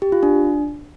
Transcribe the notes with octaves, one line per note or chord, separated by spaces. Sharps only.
G4
F4
D4